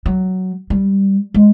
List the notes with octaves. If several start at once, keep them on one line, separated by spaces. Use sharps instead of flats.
F#3
G3
G#3